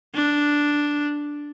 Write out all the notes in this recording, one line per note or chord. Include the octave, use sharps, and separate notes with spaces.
D4